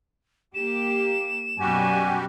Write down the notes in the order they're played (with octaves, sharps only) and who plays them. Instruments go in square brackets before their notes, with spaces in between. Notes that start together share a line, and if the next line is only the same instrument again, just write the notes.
[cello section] A#3 G4 [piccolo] E7
[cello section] F#2 B2 [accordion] G3 F#4 G4 [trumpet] G#5